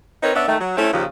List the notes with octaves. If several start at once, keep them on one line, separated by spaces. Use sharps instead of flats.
C4 D#4 A#4 B4 C#5
B3 C#4 D4 D5 E5
D#3 A3
F#3
A3 C4 C#4 E4
D#2 A#2 C#3 F3